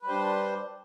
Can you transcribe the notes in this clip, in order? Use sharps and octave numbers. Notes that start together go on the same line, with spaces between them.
G3 D4 B4 C5